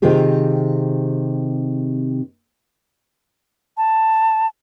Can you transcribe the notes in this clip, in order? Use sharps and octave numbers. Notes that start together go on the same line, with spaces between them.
C3 D#3 C4 F4 G4 G#4
A5